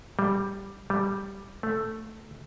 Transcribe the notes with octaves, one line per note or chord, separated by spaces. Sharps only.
G3
G3
A3